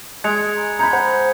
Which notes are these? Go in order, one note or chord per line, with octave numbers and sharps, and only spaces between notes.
G#3 G#6 C#7 F7
A#5 B5
A#5 B5 G6 G#6 C#7
C5 F#5